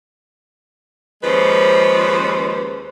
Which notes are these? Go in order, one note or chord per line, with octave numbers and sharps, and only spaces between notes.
D#2 F3 G#3 C#4 B4 C5